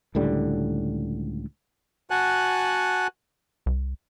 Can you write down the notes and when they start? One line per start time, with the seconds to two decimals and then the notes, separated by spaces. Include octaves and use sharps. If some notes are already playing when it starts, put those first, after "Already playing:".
0.15 C#2 A2 D3 G3
2.10 F#4 F#5 G#5 A5 F#6
3.66 C2